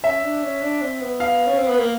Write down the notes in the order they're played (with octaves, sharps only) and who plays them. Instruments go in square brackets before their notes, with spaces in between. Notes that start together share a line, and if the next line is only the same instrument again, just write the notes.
[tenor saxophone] C#4 [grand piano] E5
[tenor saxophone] D4
C#4
D4
C4
B3
[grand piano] F5
[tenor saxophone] C#4
C4
B3
A#3